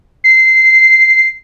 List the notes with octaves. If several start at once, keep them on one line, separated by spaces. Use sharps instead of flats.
C7